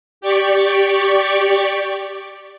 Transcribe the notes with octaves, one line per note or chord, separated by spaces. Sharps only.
G4 D5 C#6